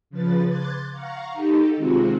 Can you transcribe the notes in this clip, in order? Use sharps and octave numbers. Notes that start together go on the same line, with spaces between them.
C#3 F3 B4 A6
C6 D6 F#6 G#6 A6
F5 F#5 A#5 C#6
D#4 G4 A4
C3 D#3 G#3 C4 F4 F#4